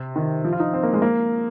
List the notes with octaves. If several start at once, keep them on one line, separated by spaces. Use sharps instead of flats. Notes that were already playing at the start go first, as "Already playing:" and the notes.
Already playing: C3
D#3
F3
F4
D#4
C4
A#3
G#3
A#3